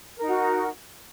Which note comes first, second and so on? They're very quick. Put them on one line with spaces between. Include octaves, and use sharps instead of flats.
A#4 D#4 F#4